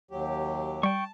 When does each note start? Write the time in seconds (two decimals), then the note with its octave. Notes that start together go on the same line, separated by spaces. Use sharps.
0.11 D#2 F#3 G4
0.83 G3 G5 A5 C#6